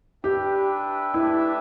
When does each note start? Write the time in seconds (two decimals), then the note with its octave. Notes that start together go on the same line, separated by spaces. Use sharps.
0.24 D4 G4 B4 E5 G5
1.14 A3 D4 E4 G4 B4 E5